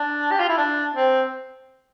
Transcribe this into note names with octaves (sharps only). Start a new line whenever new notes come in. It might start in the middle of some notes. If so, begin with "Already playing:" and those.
Already playing: D4
G4
F4
E4
D4
C4